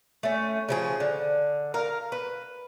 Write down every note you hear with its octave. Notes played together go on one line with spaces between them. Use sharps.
A3 C#4
C#3 F3 G#4
D3
A#4 F5
B4